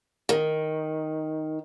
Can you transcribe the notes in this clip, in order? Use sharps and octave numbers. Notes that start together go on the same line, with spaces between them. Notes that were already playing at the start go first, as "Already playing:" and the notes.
D#3